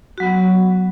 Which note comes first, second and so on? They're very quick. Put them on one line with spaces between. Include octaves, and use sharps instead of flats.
F#4 F#3 B3